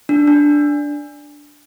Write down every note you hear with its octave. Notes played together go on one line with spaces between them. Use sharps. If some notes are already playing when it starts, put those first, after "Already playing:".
D4
D4